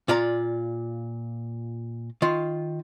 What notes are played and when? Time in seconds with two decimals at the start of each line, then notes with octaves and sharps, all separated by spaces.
0.08 A#2 F4 D5 A#5
2.22 D#3 F4